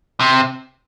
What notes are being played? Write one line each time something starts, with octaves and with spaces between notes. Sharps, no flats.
C3